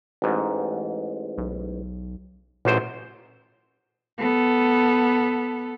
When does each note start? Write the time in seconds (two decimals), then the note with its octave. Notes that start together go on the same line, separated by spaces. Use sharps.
0.22 A1 G#2
1.38 B1
2.65 A1 F#2 A#2 C5
4.18 B3 A4